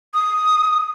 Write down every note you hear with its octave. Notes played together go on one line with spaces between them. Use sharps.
D#6